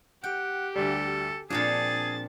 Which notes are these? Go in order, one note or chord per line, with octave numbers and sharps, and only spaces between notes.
G4 F#5 G5
D2 D3 G3 A4
A#2 F3 C4 D4 G#4 A5 A6